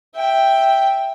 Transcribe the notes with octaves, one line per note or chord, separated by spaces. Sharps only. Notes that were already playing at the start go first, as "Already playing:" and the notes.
E5 G5